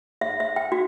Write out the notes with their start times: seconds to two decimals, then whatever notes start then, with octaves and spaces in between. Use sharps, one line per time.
0.21 E5
0.40 E5
0.56 G5
0.72 F#4